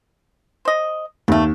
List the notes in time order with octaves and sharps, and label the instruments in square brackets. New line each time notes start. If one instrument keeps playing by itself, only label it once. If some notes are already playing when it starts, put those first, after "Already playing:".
[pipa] C5 D#5
[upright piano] D#2 [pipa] G3 A3